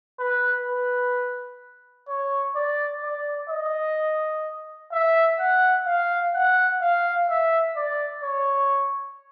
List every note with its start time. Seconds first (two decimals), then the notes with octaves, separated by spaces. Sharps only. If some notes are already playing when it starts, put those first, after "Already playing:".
0.19 B4
0.66 B4
2.08 C#5
2.55 D5
3.03 D5
3.50 D#5
4.92 E5
5.39 F#5
5.86 F5
6.34 F#5
6.81 F5
7.29 E5
7.76 D5
8.23 C#5